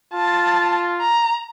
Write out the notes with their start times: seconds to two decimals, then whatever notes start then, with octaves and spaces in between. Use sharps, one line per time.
0.14 F4 A5
1.01 A#5